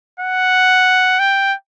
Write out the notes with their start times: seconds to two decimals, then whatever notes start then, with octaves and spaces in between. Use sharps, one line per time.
0.20 F#5
1.19 G5